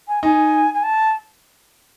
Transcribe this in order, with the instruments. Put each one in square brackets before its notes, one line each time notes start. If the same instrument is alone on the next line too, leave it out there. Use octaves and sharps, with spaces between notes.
[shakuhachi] G#5
[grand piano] D#4 [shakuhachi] G#5
[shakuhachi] G#5
A5